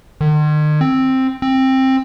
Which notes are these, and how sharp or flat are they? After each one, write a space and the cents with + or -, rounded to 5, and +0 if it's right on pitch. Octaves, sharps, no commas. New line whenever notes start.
D#3 -45
C4 +5
C4 +15